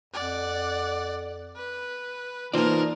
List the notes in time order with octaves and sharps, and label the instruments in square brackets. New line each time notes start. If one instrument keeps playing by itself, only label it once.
[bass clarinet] F2 [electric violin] D5 F#5
[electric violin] B4
[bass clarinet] E3 [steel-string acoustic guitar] A#3 F4 [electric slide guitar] D#4 C5 D5 [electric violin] A#4 A5